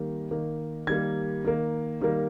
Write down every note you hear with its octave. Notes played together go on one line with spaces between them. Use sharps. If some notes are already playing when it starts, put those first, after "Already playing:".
Already playing: D#3 G3 A#3
D#3 A#3
D#3 G3 A#3 G#6
D#3 A#3
D#3 G3 A#3